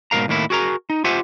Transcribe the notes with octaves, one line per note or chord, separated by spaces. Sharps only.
G#2 B2 E3 A#4 F5 A#5
D#2 A2 A#3 E4
F#4 G#4 A#4 A#5
D#4
F4 G4 C5 E5 F#5 G#5